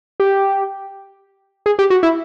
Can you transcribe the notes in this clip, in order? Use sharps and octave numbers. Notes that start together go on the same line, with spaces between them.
G4
G#4
G4
F#4
E4